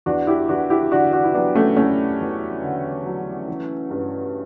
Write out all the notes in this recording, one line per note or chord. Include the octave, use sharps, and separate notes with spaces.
E2 D4 F#4
E4 G4
E2 D4 F#4
E4 G4
D3 D4 F#4
D4 F#4
E4
F#3 B3 D4
A3 C#4
E2 A3 C#4
E2
D3
F#3
E3
G2